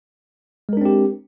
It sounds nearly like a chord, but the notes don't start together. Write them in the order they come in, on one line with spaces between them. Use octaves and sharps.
G#3 A#4 D4 C4 G4